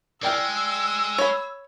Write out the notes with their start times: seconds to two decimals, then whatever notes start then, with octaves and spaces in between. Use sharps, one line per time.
0.23 G#3 D5 G5 E6 F6
1.18 C#5 B5